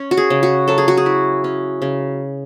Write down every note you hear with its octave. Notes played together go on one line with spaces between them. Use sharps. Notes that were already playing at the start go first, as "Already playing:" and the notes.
Already playing: C#4
F#4
G#4
C#3
F#4
F#3 A4
G#4
F#4
G#4
E4
C#4
C#3